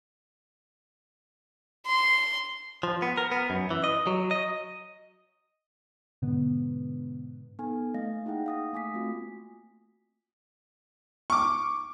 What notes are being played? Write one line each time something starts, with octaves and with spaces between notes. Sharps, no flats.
C6
F3
B3
A#4
B3
F#2
E3
D#5
F#3
D#5
G#2 B2 D3 B3
B3 D#4 A4 G#5
A3 A#3 D#5 F5 A#6
A#3 D#4 E4 G#4 F#5 G5
F5 D#6 A#6
A3 A#3 G#5 D6 D#6 B6
A3 A#3 C4 F4 F#4
C#6 D6